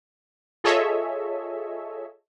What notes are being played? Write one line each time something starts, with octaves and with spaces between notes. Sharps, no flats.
F4 G#4 A4 C#5 D#5 E5